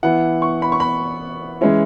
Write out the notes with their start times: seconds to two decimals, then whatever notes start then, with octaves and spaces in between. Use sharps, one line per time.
0.03 E3 B3 E4 F#5
0.42 C#6
0.62 B5
0.72 C#6
0.80 B5
1.61 E3 G#3 C#4 E4